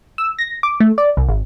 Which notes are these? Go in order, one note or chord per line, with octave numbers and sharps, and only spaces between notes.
E6
A#6
D6
A3
D5
C2
G#1